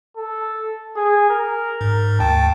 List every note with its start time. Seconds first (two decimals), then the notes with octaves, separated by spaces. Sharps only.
0.17 A4
0.96 G#4
1.30 A#4
1.81 G#2
2.20 D2 G5 A5